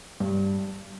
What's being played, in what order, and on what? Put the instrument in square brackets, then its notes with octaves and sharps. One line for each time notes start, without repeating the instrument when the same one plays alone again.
[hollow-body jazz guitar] G2